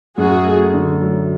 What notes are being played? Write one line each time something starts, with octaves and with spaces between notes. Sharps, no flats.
F#2 F#4 G#4
A3
D3
F#3